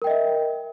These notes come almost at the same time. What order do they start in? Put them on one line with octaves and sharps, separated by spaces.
A#4 G5 D#5 E5